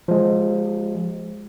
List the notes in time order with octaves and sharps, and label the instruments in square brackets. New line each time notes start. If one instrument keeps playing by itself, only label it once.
[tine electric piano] F3 G#3